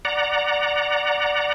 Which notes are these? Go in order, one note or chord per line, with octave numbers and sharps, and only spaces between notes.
D5 F#5 A#5